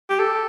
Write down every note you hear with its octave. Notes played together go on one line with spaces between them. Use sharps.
G4
A4